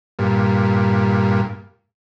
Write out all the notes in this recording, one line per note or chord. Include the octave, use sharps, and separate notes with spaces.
G2 A#2